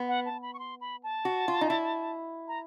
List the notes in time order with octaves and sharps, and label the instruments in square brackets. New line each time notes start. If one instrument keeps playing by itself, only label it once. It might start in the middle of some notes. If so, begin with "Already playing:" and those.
Already playing: [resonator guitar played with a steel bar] B3
[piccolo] F#5
A5
B5
C#6
C6
B5
A5
[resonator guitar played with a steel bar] F#4
F4
D#4
E4
[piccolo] A#5